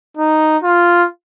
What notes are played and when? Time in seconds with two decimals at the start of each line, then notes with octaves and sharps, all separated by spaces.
0.17 D#4
0.63 F4